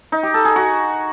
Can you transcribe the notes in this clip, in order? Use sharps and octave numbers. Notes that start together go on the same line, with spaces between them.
D#4
G4
A4
G#4
F#4